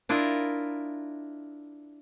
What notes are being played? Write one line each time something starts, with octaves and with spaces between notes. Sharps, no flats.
D4 E4 F4 A#4 D#5 E5